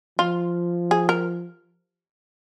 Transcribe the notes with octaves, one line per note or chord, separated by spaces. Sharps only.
F3 F4
G#4
A#4